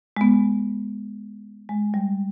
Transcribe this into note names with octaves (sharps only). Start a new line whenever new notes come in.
G#3
B3
G#3
G3